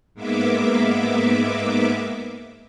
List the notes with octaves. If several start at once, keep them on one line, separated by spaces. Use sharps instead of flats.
G#2 G#3 A#3 B3 E5 D6